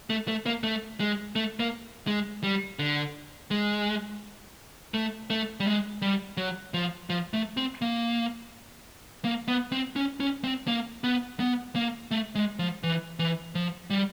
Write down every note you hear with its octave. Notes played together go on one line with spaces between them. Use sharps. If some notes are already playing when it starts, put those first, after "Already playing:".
A3
A3
A#3
A3
G#3
A3
A#3
G#3
G3
D3
G#3
A3
A3
G3
G#3
G3
F#3
F3
F3
A3
C4
A#3
A#3
B3
C4
C#4
C#4
C4
A#3
B3
B3
A#3
A3
G#3
F3
E3
E3
F3
G3